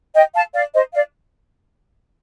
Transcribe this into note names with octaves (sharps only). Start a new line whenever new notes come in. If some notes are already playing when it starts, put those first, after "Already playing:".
D#5 G5
F5 A5
D5 F5
C5 D#5
D5 F5